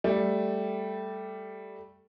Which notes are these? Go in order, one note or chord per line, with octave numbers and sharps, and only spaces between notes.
G3 A3